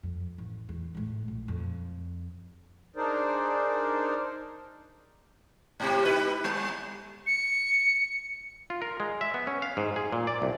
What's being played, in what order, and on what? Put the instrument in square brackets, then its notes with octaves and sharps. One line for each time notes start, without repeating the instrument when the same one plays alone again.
[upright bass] F2
A1
E2
G#1 A2
A#1
F2
[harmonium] D4 D#4 G#4 A#4 C5 D5
[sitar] G#2 C3 G4
D#4 E4 B4
G3
[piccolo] C#7
[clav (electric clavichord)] F4
A#4
G#3
E5
B3
C#4
F5
G#2
G#4
A#2
D5
C2